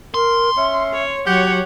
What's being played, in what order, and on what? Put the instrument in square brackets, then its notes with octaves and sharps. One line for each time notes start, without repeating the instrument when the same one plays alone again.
[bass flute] A#4 [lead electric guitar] C6
[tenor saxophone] C#4 [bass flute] E5
[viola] C#5
[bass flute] F#3 [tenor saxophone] G4 [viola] C#5 F#5